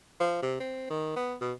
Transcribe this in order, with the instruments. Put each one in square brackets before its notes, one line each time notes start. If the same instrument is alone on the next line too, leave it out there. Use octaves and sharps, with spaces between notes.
[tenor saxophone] F3
C3
C4
D#3
B3
B2